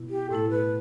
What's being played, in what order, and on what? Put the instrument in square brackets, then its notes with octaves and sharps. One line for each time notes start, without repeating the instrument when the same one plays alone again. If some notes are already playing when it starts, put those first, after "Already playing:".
Already playing: [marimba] B2 B3 E4
[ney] G4
[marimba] A2 A3 E4 [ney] A4
[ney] B4